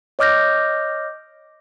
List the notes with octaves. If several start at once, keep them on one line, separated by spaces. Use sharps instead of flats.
C#5 D#5 D6 F6 G6 A#6